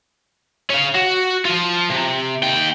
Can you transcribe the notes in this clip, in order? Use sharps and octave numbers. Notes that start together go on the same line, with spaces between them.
C#4 F5
F#4
F3 F4
C3
D#2 G5